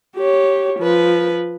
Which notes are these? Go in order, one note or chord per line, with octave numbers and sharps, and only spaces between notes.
G4 C#5
F3 B4